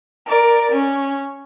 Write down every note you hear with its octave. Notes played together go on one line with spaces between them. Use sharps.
A#4 D5
C#4